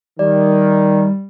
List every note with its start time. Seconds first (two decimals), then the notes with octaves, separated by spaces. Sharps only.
0.19 D#3 G3 D5